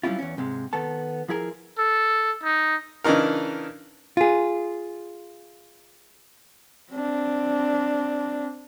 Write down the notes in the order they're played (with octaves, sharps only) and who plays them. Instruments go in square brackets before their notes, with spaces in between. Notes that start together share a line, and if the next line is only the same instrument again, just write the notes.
[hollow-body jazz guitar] F#3 G3 C4 C#4 E4 F4
E2 C#4
G#2 C3 G#3
D#3 B3 A4 A5
F3 E4 G#4 A#4
[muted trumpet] A4
D#4
[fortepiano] C#3 E3 D4 D#4 A#4
[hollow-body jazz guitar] F4 G#4
[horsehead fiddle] C4 D4